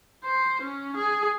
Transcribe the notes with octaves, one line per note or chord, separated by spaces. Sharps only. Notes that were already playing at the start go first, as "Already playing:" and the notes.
C5
C#4
G#4